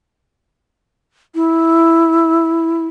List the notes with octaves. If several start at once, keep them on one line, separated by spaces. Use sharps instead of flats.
E4